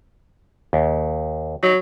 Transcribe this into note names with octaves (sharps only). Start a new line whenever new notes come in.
D#2
F#3 D#4